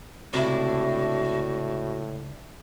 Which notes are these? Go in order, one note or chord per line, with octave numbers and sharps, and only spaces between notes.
C#2 A2 C3 D4 E4 F#4